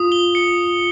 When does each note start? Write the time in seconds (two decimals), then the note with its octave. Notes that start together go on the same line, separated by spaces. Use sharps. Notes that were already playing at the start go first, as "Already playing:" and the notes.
Already playing: F4 D#6
0.12 G7
0.35 C#7